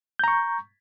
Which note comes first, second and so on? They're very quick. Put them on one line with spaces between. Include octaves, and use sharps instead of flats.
G6 A#5 C#6